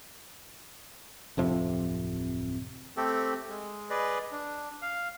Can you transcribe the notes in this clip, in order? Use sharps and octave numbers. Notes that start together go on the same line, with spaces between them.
D1 F2 C3 F3
A3 C4 G4 A4
G#3
G#4 B4 D5 D#5
D4
F5